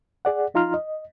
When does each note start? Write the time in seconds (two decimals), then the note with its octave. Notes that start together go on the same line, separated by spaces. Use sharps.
0.25 G#4 D5 F#5
0.54 F3 D#4 F4 A#5 C6 F6
0.74 D#5